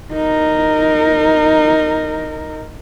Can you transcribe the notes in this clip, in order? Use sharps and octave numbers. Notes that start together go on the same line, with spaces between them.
D#4 A#4